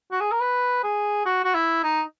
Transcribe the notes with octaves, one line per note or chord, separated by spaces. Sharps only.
F#4
G#4
A#4
B4
G#4
F#4
F#4
E4
D#4